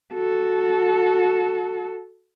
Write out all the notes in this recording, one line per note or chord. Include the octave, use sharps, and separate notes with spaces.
F#4 A4